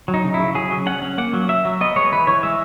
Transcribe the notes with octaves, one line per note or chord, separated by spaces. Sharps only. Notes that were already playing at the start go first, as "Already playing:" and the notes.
F#3
D#4
C#3
E4
C#3
F#3 G#4
F#3
C#4 F#5
C#4
A#3 F#5
F#3
F#3 E5
F#3
B3 D#5
G#3 C#5
E3 B4
E3 C#5
G#3 E5